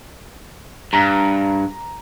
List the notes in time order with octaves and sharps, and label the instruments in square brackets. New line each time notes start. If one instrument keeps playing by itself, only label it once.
[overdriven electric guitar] G2 [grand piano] A#5